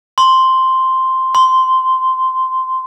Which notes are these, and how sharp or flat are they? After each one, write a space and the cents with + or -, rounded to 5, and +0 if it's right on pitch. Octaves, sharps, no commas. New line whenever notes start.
C6 +0
C6 -10